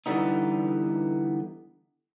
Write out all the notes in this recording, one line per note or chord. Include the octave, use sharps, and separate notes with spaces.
D3 E3 G3 B3 D#4